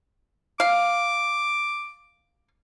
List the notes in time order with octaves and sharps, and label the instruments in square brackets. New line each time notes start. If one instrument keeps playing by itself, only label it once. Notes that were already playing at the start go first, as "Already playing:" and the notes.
[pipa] F5 [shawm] D6